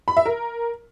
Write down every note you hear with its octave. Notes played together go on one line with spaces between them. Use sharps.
B5
E5
A#4